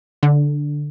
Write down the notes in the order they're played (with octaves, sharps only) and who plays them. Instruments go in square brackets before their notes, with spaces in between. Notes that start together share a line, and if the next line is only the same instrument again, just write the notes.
[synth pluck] D3